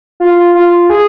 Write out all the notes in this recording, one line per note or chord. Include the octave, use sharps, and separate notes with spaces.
F4
F4
G#4